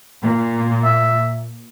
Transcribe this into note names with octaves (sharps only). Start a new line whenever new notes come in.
A#2
E5